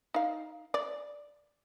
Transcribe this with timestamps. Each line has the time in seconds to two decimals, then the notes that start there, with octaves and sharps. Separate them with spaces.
0.14 D#4 F5
0.74 D5